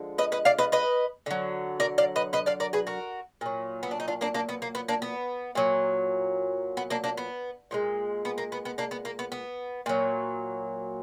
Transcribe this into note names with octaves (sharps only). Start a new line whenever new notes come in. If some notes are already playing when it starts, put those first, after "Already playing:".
Already playing: D3 F3 G#3
B4 D#5
B4 D#5
D5 F5
B4 D#5
B4 D#5
D3 F#3
A#4 D5
D5 F5
B4 D#5
B4 D#5
D5 F5
A#4 D5
G#4 B4
F#4 A#4
A#2 F#3
B3
D4
D#4
D4 F4
A#3 D4
A#3 D4
B3
A#3
B3
A#3 D4
B3
A#2 F#3
B3
A#3 D4
A#3 D4
B3
A#2 F3 G#3
B3
A#3
B3
B3
A#3 D4
B3
A#3
B3
B3
A#2 F#3